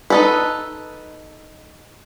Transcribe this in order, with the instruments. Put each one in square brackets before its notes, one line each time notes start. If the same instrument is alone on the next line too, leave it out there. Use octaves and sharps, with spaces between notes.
[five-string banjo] D#4 A4 B4